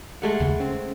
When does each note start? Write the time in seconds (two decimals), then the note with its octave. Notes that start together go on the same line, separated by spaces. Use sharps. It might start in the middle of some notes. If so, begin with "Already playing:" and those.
0.22 G#3 A3 F#5
0.40 D#2 C#3
0.60 C4 C#4